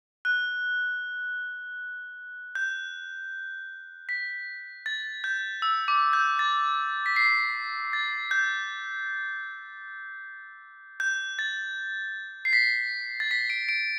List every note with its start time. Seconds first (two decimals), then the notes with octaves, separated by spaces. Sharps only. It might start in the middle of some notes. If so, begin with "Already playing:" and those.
0.25 F#6
2.55 G6
4.09 B6
4.86 A6
5.24 G6
5.62 E6
5.88 D6
6.13 G6
6.39 A6
7.06 B6
7.16 C7
7.93 A6
8.31 G6
11.00 G6
11.39 A6
12.45 C7
12.53 B6
13.20 A6
13.31 B6
13.50 D7
13.69 D7